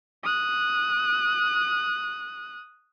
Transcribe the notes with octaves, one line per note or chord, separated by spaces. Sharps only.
D#6 F#6